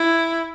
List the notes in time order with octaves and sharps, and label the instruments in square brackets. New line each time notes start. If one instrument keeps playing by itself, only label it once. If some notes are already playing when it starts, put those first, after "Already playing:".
Already playing: [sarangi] E4